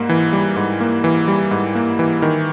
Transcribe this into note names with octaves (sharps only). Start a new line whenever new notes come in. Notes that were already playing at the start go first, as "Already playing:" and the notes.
Already playing: G#2 G3 A#3
E3
G3
G#2
A#3
E3
G3
G#2
A#3
E3
D#3